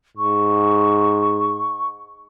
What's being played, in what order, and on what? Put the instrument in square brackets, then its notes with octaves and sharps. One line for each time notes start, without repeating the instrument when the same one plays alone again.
[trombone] G#2 [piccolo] C#6